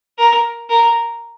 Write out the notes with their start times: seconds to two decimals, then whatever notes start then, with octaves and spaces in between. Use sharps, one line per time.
0.18 A#4
0.69 A#4